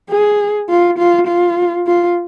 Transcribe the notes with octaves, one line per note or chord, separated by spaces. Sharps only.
G#4
F4
F4
F4
F4